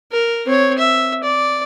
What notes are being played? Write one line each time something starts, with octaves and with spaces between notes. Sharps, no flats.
A#4
C4 C#5
E5
D5